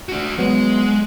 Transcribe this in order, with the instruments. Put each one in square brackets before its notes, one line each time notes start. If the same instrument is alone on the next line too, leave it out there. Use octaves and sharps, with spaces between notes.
[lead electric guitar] D4 F#4
[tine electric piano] F#3 B3 [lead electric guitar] G#3